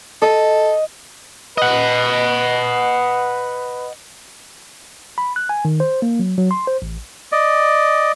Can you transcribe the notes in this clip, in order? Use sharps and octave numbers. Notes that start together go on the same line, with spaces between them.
A4 D#5
B4 D#5 F#5
B5
F#6
G#5
D#3
C5
A#3
F#3
F#3
C6
C5
A1
D5 D#5